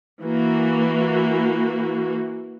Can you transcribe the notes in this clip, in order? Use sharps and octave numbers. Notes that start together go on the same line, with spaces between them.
E3 A#3 F#4